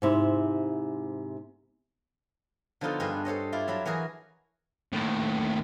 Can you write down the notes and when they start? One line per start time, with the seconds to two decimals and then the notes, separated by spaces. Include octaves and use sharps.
0.02 G#2 C3 E4
2.81 D3 F3 B3 D#4 F4 A4
3.00 G2 D4 G#4 B4 D#5
3.25 A4 C5 C#5 D#5
3.52 E4 F4 D5 E5
3.68 F#3 E5 A5 B5
3.86 E3 F#4 G#4 A#4
4.92 D#2 A2